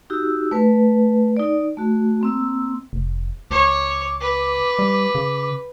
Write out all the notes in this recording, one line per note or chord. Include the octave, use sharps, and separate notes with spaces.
D#4 F#4 G4 E6
A3 B4
D#4 D5
A3 F#4
A#3 C4 E6
F1
C#2 C#5 D6
B4
G3
C#3